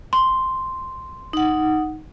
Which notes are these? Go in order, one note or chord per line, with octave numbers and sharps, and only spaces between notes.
C6
D#4 F#5